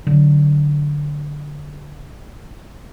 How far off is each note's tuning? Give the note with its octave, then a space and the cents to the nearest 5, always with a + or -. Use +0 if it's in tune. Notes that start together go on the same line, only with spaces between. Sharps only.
D3 +0 F#3 +0